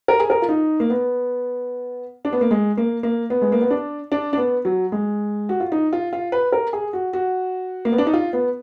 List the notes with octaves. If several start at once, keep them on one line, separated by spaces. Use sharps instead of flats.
A#4
G#4
A#4
F4
D#4
A#3
B3
D4
B3
A#3
G#3
A#3
A#3
B3
G#3
A#3
B3
D4
D4
D4
B3
F#3
G#3
F#4
F4
D#4
F4
F4
B4
A#4
G#4
F#4
F#4
A#3
B3
D4
D#4
F4
B3